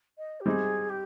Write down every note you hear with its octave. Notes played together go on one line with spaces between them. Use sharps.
D#5
G4
G3 C4 D#4 G#4
G4